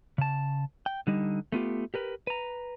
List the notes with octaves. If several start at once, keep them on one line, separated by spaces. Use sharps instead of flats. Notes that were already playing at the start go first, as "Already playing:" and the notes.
C#3 A5
G5
D3 G3 D#4
A3 B3 F4 G4
G4 A#4 B4
B4 A#5